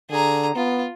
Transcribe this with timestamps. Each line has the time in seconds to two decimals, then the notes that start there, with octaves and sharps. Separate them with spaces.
0.10 D3 G#4 A#5
0.56 B3 F4